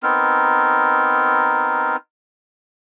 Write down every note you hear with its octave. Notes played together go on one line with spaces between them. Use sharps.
B3 C4 D#4 A#4